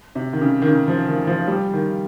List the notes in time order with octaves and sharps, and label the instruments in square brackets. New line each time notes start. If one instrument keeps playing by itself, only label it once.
[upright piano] C3
D#3
C#3
D#3
C#3
F3
D#3
F3
G3
D#3